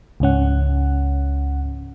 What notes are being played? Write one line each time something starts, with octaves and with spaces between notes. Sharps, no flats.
C#2 G#2 C#4 F#5